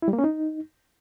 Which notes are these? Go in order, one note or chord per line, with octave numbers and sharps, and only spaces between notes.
E4
G3
A#3
C#4
D#4